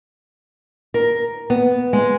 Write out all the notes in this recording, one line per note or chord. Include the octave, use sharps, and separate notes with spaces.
A#4
B3
G#3